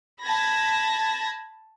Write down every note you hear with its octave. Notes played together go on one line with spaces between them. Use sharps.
A5 B5 G#6 A#6